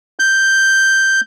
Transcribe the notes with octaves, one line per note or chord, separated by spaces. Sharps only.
G6